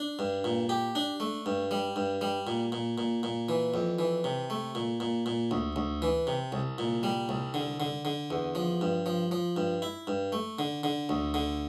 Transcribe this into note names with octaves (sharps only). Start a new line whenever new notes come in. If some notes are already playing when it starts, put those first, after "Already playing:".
Already playing: D4
G2
A#2
G4
D4
A3
G2
G3
G2
G3
A#2
A#2
A#2
A#2
E3
F2
E3
C3
A3
A#2
A#2
A#2
D2
D2
E3
C3
C2
A#2
G3
C2
D3
D3
D3
E2
F3
G2
F3
F3
G2
E4
G2
A3
D3
D3
D2
D3